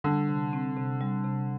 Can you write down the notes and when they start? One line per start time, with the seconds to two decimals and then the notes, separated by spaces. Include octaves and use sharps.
0.04 D3 G3
0.29 C3
0.53 C4
0.77 C3
1.01 G3
1.24 C3